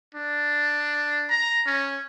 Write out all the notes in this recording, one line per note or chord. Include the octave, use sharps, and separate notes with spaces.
D4
A#5
C#4